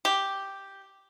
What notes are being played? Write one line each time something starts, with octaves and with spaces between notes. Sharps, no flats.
G4